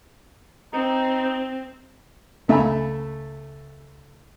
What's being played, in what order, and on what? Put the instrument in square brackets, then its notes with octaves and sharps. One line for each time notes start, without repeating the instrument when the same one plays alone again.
[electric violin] C4 [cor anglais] D#4
[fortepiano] C#2 A3 E5 G#5 A#5 B5